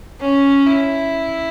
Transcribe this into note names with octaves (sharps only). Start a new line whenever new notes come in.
C#4
E4